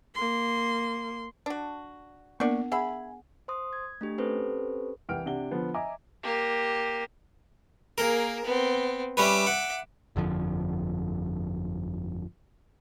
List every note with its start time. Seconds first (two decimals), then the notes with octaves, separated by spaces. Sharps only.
0.15 A#3 C6
1.46 D4 F#4
2.40 A#3 B3 D4 A#4 D5 F#5 C#6
2.72 G#4 E5 F#5 G#5 B5
3.48 C5 C6 D#6
3.73 G#6
4.01 A3 D4 G4
4.18 C4 C#4 G4 A4 B4 C5
5.09 C2 E3 F#5 G5 F6 D7
5.26 C3 D4 F#5 G7
5.51 D3 F3 B3
5.74 D#5 E5 G#5 A#5 D6
6.23 A#3 G4
7.98 A#3 G#4 A#4
8.44 B3 C4
9.17 G3 C#4 B4 E5 D6
9.47 F#5
10.16 G1 F2 D3 F3